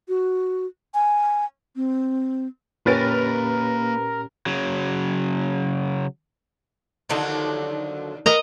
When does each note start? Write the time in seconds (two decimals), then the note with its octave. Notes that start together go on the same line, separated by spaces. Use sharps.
0.08 F#4
0.94 G#5
1.76 C4
2.86 A#2 A#3 C#4 G4 A#4 B4 C#5 A6
4.46 C#3 F#3
7.09 D#2 D3 F3 F#3 D4 D#4
8.26 B3 A#4 D#5 A#5